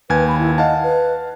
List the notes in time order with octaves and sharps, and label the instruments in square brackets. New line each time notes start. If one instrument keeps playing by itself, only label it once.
[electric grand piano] D#2 G#5 G#6 [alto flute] B4
[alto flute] B5
E4
[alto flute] D#5 [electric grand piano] F5 F#5 A5
[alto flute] B4